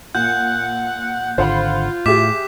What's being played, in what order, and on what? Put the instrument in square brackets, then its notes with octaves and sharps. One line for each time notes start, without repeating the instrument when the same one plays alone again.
[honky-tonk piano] A#2 [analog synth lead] F#5 [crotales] F#6 G6
[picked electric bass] G#1 D3 [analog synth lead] F4 [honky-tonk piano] C5 F#5 B5
[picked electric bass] A2 [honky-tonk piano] G4 G#4 E5 [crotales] D6 B6 E7